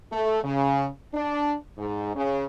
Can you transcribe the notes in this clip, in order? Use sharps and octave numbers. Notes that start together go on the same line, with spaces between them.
A3
C#3
D4
G#2
C#3